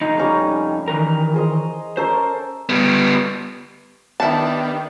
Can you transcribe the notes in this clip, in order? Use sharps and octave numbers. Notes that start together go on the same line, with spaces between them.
F2 D#4 D#5
G3 C#4 A#5
D#3 E3 A#4
G#4 C5 D#5
C#4 A4 A#4 C5
G3 B3
D#3 B3 D4 E4 G4 A5